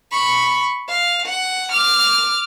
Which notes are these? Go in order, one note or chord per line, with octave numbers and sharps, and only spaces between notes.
B5 C#6
F5
F#5
D6 F6